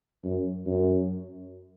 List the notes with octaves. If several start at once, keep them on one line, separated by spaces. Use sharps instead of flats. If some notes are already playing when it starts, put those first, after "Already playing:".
F#2
F#2